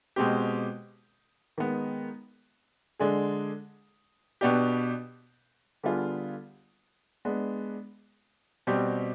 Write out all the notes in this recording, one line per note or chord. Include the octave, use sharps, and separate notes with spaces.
B2 G#3 C4 G4
D#3 G#3 B3
D3 G#3 D4 G#4
B2 B3 D4 G4
D3 G3 B3 F4 G#4
G#3 B3 D4
B2 G3 C4 G4